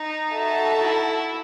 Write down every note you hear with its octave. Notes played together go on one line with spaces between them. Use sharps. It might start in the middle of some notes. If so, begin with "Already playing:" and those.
Already playing: D#4
F#4 A4 E5 A5
E4